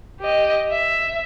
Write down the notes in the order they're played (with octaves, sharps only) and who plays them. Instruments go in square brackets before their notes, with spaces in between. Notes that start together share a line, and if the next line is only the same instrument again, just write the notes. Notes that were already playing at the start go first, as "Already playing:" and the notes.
[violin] G4 D#5
E5